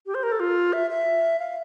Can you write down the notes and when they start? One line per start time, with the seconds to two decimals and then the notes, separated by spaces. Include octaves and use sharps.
0.07 G4
0.15 C5
0.23 A#4
0.32 A4
0.40 F4
0.73 E5
0.90 E5
1.39 F5